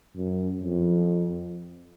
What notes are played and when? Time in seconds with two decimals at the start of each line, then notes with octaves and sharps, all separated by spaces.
0.16 F#2
0.62 F2